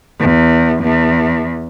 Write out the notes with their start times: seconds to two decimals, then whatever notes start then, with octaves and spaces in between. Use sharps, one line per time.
0.20 E2
0.83 E2